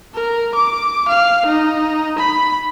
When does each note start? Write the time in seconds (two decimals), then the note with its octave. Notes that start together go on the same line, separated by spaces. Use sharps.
0.14 A#4
0.55 D6
1.09 F5
1.46 D#4
2.19 B5